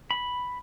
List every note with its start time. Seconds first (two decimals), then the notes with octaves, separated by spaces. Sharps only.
0.11 B5